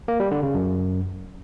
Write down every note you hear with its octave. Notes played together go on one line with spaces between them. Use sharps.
A#3
G3
D3
C#3
F#2